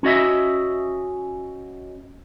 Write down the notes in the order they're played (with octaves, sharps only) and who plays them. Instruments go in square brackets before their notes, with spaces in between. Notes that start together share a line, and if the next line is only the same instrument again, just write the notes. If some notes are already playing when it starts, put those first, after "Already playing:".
[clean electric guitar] C#4 F#4 D#5 E5